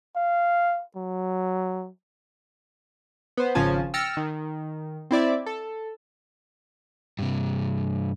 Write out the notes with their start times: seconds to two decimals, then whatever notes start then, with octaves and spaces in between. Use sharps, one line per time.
0.16 F5
0.96 F#3
3.37 B3 C5
3.55 G#1 C#3 F3 C#4 G#5 A5
3.94 G5 E6 F6 A6 A#6 C#7
4.17 D#3
5.11 C4 E4 D5 E5
5.46 A4
7.19 G2 C3